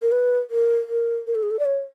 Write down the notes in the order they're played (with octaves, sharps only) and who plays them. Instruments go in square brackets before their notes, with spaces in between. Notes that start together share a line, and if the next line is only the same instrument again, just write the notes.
[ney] A#4
B4
A#4
A#4
A#4
A4
G#4
A4
D5
C#5